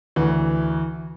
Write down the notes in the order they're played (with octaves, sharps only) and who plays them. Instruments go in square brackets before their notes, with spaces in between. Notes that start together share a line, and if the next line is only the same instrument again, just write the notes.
[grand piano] D2 [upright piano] E3